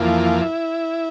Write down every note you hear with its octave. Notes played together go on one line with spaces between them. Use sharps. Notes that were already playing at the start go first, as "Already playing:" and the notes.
Already playing: F2 E3 A#3 F4
E4